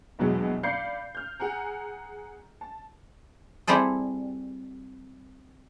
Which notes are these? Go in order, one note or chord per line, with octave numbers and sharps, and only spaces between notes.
A#1 E2 B2 F#3 G#3
D5 F5 B5 G6 C7 C#7
F6 G6
G#4 F#5 G#5 A#5
A5
G3 C4 E4 G#4 A4